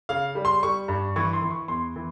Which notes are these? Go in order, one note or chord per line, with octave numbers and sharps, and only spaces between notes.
C#3 F5
G3
C6
G3 C#6
G2
E3 C#6
C6
E3
C#6
E2 C6
E3